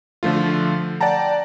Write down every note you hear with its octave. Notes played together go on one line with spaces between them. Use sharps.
D3 F3 A3 F4
D5 F#5 G5 A5 A#5